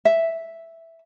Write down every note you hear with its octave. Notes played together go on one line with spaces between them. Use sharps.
E5